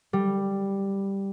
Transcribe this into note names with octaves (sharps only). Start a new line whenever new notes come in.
G3